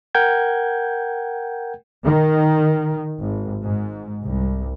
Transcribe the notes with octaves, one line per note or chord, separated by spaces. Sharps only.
A#4 F#5 G5 G6 G#6
D#3
G#1
G#2
C2